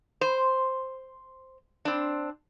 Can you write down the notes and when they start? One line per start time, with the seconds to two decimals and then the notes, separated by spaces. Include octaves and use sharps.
0.21 C5
1.85 C4 D4